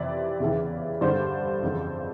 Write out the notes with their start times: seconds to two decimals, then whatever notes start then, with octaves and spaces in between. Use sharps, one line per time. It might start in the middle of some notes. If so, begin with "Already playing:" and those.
Already playing: F2 C3 E3 D5 E5
0.40 E2 C#3 E3
1.01 G2 D3 C5 D5
1.62 F2 C#3 E3